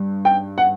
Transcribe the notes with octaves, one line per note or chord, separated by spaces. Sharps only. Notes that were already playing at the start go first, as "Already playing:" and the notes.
Already playing: G2
G5
F#5